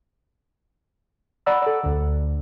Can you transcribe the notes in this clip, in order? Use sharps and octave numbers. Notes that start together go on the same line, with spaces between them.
D5 F#5 A#5 B5 E6
A4 D5
D2 D3